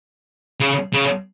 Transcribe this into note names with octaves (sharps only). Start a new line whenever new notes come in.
C#3
C#3